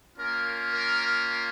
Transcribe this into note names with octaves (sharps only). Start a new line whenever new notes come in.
A#3 C#4 F4 A#4
A#4